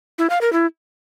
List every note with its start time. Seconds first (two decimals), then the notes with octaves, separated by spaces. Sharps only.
0.18 E4
0.30 F5
0.41 A#4
0.53 E4